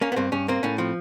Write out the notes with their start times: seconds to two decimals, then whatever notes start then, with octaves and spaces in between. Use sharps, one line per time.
0.01 A#3 C#4
0.12 B3
0.16 G2 C4
0.32 G2 C#4
0.48 A#3 C4
0.63 A2 C#4
0.78 F3 C4